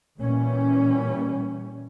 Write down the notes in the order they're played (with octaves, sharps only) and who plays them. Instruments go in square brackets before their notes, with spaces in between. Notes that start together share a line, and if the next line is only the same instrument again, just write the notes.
[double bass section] A#2 E3 G3 C#4